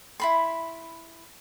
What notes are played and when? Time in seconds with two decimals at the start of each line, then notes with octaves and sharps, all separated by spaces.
0.20 E4 B5 C6